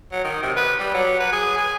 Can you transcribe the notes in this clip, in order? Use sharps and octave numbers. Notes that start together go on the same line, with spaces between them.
F#3
D#3
C3
B4
G3
F#3
B4
G#4
G#4